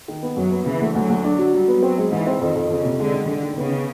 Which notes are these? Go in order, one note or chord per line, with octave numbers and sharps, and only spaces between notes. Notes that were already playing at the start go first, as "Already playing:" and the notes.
D#3
B3
F#2 F#3
B3
C#3 E3
D2
D2 F#3
D2
D4
F#3
F#3 G3
B3
F#3 C4
G#3
G#2 E3
C4
F2 D#3
F2
F2 C#3
C3
D3 G#3
D#3
D3 D#3
D#3
C#3 B3